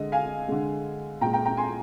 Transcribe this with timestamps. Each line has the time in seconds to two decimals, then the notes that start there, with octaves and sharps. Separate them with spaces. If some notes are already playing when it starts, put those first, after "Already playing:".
Already playing: D3 G#3 D#5
0.12 F5 G#5
0.48 D3 G#3
1.21 A#2 G5 A#5
1.25 G#3
1.33 G5 A#5
1.45 G5 A#5
1.57 G#5 C6